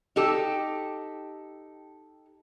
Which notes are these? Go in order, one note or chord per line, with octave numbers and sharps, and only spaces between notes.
D#4 G4 A4